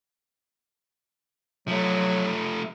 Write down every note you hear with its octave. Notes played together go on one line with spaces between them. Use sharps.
F3 F#3 A3